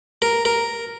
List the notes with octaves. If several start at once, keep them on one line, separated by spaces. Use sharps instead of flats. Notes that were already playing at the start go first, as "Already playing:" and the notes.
A#4
A#4